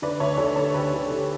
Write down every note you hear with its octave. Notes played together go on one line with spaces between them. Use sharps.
D3 B4 D5
D2 C#5 E5
D3 A4 C#5
D3 A4 C#5
D2 G4 B4
D3
D3